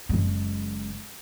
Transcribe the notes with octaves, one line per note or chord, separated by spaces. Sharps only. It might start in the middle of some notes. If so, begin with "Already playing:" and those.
F#1 G#3